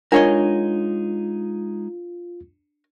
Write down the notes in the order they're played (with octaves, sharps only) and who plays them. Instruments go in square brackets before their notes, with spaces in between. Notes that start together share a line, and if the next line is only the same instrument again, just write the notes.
[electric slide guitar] G#3 D#4 [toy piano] D4 F#5 [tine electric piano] F4 [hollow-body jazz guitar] A#4 C#5 D#5